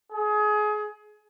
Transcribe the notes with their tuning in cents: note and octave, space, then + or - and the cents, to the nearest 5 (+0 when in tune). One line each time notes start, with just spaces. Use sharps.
G#4 +25